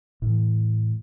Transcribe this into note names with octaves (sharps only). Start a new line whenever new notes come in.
A2 E3